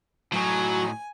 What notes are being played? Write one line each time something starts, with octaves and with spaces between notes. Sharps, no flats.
A2 F#3 D#4 G#5